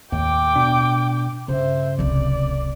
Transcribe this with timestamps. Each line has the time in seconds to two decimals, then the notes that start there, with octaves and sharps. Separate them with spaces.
0.12 D#2 A2 G5 D6
0.56 B2 D4
1.48 G2 C#3 C5 E5
1.99 D1 C2 D5